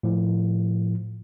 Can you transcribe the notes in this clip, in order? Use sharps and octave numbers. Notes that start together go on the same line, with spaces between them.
A2 F3